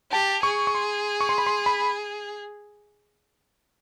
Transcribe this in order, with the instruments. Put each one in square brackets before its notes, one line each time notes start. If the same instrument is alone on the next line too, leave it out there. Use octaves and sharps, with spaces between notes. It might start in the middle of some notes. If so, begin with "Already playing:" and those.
[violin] G4 [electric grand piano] A5
[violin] G#4 [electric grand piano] C#6
[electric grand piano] C#6
C6
C#6
C6
B5
C6
B5